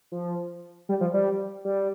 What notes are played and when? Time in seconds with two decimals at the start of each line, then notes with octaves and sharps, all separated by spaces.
0.12 F3
0.89 G3
1.01 F3
1.14 G3
1.65 G3